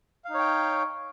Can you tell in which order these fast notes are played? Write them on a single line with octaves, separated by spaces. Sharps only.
F5 D#4 C#5 G5